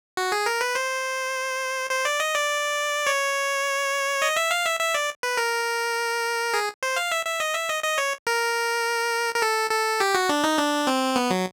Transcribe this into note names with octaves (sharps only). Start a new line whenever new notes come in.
F#4
G#4
A#4
B4
C5
C5
D5
D#5
D5
C#5
D#5
E5
F5
E5
E5
D5
B4
A#4
G#4
C5
F5
E5
E5
D#5
E5
D#5
D#5
C#5
A#4
A#4
A4
A4
G4
F#4
D4
D#4
D4
C4
B3
F#3